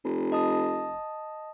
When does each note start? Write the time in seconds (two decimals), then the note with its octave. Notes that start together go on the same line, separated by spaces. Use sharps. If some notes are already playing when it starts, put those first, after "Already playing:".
0.04 F1
0.32 D#5 A5 D#6